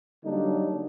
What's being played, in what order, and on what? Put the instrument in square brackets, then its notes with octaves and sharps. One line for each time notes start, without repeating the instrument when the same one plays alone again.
[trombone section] D3 F#3 G3 A#3 D4 D#4